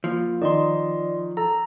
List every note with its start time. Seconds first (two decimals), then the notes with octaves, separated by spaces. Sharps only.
0.04 F3 A#3
0.41 D#3 D5 D#5 C6
1.37 A4 A#5